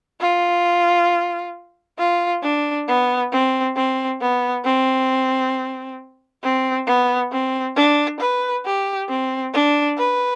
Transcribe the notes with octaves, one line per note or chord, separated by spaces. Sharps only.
F4
F4
D4
B3
C4
C4
B3
C4
C4
B3
C4
D4
B4
G4
C4
D4
B4